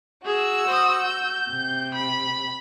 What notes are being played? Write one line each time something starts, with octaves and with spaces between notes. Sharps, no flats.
F#4 G#4 E6
C5 D#6
G6
C3
B5